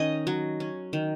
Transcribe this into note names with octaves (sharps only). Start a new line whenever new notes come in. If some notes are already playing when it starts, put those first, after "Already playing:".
Already playing: D#3 C#4 D#5
F#3
C#4
D#3